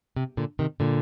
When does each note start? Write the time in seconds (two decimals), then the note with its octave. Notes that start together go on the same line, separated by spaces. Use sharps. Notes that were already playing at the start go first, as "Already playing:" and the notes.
0.16 C3
0.37 A#2 D3
0.59 C3 D#3
0.80 A#2 D3